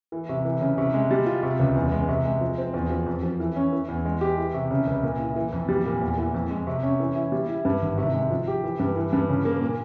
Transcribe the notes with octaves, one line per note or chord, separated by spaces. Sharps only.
E3
C3
E3
C#3
C3
G#3
G3
F4
C3
C#2
E2
G#3
C3
G#3
F3
C4
E2
F3
F2
F3
E3
C#4
E3
E2
G#3
G4
E3
C3
C#3
C#2
A#2
E4
E3
F2
G3
A#2
E2
E3
F2
G#3
C3
C#4
E3
E4
G3
E4
G2
G#1
C3
G#3
F3
G4
E3
G2
E3
G2
C#3
A#3
A#2